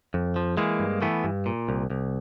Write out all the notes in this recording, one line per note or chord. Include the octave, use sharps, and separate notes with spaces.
F2
F3
E3 G#3 A#3
G2
E3 A3 B3
G2
A#2
C2
C2